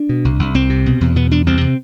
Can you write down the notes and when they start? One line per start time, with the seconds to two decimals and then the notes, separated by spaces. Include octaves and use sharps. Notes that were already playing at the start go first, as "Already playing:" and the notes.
Already playing: D4
0.09 B2
0.25 C2
0.39 C2
0.55 C2 C4
0.70 C3
0.86 B2
1.01 E2
1.16 B2 B3
1.31 E2 D4
1.46 C2 C4
1.61 C3